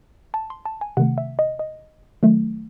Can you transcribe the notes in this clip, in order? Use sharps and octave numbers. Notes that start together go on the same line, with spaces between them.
A5
C6
A5
G#5
C3 D#3 A3 F#5
E5
D#5
D#5
D#3 F#3 A3